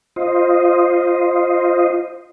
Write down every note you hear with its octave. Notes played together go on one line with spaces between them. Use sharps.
F4 C5 D#5